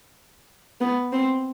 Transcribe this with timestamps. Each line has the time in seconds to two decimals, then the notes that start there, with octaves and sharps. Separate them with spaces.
0.81 B3
1.12 C4